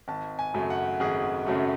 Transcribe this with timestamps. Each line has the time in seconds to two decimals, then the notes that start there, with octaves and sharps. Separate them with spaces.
0.08 G#1 A5
0.39 G#5
0.54 F#2 C#3 F#3 A3
0.70 F#5
1.00 G#1 G#4
1.46 F#2 C#3 F#3 A3